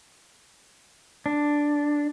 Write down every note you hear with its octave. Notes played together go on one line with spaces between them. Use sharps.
D4